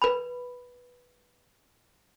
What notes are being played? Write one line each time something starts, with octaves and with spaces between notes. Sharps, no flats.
B4 B5